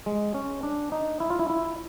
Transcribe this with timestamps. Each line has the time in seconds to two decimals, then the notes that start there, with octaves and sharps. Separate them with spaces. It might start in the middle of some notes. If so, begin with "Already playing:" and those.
0.06 G#3
0.34 C#4
0.63 D4
0.92 D#4
1.20 E4
1.30 F4
1.39 E4
1.50 E4